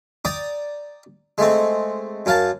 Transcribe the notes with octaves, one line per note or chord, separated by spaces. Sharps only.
D5 G5 A#5 D6 D#6
G#3 A3 C4
F#2 A#4 F5 A5